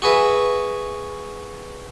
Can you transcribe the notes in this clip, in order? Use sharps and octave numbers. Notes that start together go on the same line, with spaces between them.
F#4 G#4 B4 E5